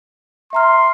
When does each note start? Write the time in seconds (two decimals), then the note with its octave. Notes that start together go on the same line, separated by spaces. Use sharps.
0.53 E5 A#5 C6 F6